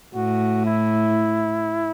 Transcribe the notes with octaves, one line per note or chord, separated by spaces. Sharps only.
A2 F#4
E4